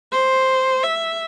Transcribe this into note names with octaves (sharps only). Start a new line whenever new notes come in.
C5
E5